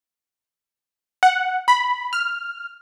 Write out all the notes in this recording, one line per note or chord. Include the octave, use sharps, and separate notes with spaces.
F#5
B5
F6